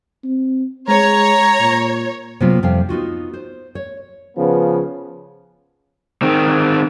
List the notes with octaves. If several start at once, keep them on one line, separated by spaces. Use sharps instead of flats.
C4
G#3 C#5 A#5
A#2
C3 F#3 A#3 B3 C#4 F4
F2 C3 G3 F5 G5
B3 D#4 F4 F#4
C5
C#5
C#3 F3 B3
D#3 C4